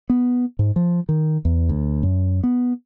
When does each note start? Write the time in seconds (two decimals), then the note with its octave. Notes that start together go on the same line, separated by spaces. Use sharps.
0.10 B3
0.59 G#2
0.76 F3
1.09 D#3
1.45 E2
1.69 D2
2.03 F#2
2.44 B3